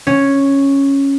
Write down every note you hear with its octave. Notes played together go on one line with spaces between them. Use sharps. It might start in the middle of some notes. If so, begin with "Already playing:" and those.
C#4